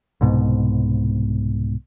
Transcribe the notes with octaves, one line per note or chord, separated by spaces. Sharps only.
C2 G#2 B2